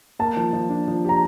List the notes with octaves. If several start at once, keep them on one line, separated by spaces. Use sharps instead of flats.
A#3 A5
F3
F3
D4
F3
G4 A#5